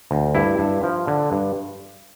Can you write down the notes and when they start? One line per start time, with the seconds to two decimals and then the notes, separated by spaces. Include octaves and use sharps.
0.11 D2
0.35 G2 E4
0.59 G2
0.83 F3
1.07 D3
1.32 G2